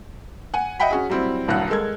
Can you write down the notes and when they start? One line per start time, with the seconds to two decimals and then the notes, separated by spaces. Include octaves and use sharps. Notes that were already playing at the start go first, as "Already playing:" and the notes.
0.54 F#5 G#5
0.80 D#5 E5 F#5 G5 B5 B6
0.91 C#4 F#4 G#4
1.10 F#3 G3 C4 E4
1.48 D#1 C2 G2 F#3 F#5 F#6
1.70 G#3 A4 A#4 G#6